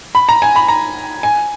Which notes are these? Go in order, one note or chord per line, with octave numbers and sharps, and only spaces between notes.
B5
A#5
G#5
B5
A#5
G#5